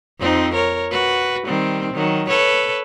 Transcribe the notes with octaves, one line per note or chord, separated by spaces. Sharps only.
F2 C4 D#4
A#4 C#5
F#4 B4
D#3 G3 C4
D#3 F#3
A4 B4 C#5